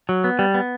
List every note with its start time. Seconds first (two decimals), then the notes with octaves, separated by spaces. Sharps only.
0.09 F#3
0.24 B3
0.39 G3
0.54 B3